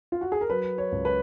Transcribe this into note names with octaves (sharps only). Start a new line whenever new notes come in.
F4
F#4
G#4
A#4
F#3 B4
C#5
C#2
B4